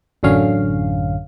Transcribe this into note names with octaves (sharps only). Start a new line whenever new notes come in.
A1 F#2 D3 C#4 F5